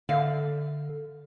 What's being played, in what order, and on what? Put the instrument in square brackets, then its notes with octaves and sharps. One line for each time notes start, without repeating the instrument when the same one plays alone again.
[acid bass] D3 [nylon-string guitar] D5 E5 F5